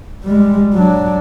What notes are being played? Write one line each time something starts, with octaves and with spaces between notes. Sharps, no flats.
G3 G#3
F#3 D4